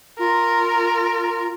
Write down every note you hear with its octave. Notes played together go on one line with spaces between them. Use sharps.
F4 A#4